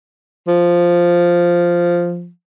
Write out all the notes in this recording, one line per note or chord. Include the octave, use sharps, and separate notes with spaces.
F3